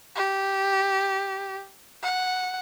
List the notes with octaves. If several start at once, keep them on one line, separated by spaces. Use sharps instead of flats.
G4
F#5